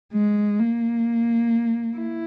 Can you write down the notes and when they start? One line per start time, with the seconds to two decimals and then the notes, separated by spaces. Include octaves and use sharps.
0.13 G#3
0.59 A#3
1.96 E4